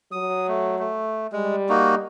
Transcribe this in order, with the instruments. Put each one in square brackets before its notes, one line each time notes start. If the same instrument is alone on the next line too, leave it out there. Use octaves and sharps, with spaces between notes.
[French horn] F#3 [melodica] D#6
[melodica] A3
A3
[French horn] G3 [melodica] G#3
[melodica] A#3 D#4 F#4